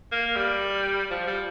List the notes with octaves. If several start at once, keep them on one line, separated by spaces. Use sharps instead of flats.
A#3
G3
F3
G3